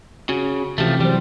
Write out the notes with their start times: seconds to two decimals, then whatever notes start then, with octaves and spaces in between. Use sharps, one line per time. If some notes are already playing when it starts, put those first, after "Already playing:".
0.29 C#3 F#4
0.78 C3 E3 F3 A3 G4
1.00 E3 F#3 G3 C5